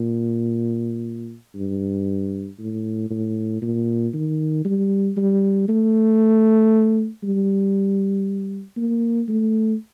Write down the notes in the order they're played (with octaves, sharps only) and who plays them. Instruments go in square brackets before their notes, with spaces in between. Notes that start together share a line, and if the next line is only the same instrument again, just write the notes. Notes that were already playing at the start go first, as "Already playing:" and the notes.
Already playing: [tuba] A#2
G2
A2
A2
A#2
D#3
G3
G3
A3
G3
A#3
A3